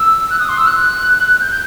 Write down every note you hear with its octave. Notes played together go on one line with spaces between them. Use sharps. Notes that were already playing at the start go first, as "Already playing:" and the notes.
Already playing: E6
F#6
D#6
C6
E6
F#6
G6
G6